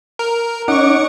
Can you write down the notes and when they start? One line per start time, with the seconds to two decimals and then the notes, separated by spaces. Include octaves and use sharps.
0.19 A#4
0.68 C#4 D#4 F#5 C#6 D6